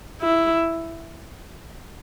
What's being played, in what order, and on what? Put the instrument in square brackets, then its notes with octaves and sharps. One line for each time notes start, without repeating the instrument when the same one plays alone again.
[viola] E4